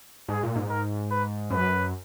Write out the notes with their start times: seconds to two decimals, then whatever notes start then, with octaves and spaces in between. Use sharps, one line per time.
0.28 G#2 G#4
0.43 A#2
0.56 G#2
0.70 A#4
1.11 B4
1.50 F#2 B4